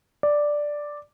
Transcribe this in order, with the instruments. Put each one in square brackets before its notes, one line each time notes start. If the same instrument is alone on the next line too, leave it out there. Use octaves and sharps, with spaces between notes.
[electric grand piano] D5